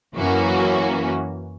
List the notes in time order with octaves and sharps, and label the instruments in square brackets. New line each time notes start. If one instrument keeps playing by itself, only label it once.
[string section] F#2 E3 A#3 C#4 F#4